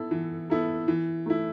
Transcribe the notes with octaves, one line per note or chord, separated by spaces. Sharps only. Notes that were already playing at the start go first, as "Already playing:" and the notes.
Already playing: B3 E4 A4
E3
B3 E4 A4
E3
A3 E4